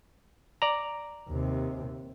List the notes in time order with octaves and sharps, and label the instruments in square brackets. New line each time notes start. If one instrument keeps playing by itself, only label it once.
[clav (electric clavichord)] D5 A#5
[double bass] D#2 C3